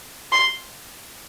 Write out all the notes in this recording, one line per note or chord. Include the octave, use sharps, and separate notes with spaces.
C6